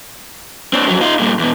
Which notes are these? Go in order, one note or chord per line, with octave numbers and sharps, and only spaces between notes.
C4 D4
F2 F#3
D#4 F4
G2 A#2
E2 B2